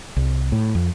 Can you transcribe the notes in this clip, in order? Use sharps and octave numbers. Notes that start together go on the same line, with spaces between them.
C2
A2
F2